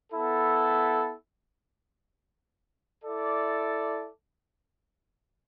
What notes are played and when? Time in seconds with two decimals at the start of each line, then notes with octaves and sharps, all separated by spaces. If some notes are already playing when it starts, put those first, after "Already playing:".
0.12 B3 E4 A4
3.05 E4 A4 D5